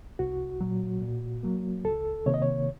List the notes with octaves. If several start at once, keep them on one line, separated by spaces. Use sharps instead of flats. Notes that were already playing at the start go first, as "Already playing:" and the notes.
C2 F#4
A#2 F#3
A#2
F#3 A#3
C#2 A4
C3 D#3 A#3 C#5
D#5
C#5